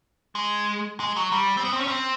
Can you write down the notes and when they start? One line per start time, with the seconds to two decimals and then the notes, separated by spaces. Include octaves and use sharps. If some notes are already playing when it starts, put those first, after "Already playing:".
0.35 G#3
1.00 G#3
1.16 F#3
1.32 G3
1.57 C4
1.65 B3
1.73 C4
1.80 C#4
1.88 C4